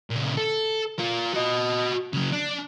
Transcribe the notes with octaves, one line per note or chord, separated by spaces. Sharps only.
A#2 C#3
A4
F4 A#4
F#4 D#5
C#3 F#3
D4